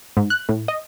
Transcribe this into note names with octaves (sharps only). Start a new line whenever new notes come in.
G#2
F#6
A2
D#5